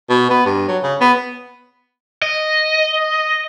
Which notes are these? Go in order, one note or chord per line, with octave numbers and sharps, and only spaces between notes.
B2
B3
G2
F#3
C#3
B3
D#5